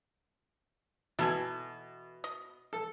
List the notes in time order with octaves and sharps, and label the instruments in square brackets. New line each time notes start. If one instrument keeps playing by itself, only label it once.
[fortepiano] B2 [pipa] E3 A4 G#5
[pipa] D#5
[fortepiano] A4